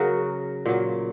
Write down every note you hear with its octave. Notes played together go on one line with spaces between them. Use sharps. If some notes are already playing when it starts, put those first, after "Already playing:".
Already playing: C#3 F#3 F#4 A#4
A#2 F#3